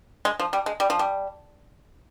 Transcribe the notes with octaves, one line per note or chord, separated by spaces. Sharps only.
G#3
F3
G3
G#3
G3
F3
G3